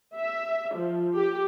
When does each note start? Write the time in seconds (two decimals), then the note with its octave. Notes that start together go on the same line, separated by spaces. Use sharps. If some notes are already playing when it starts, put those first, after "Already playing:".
0.17 E5
0.76 F3
1.17 G4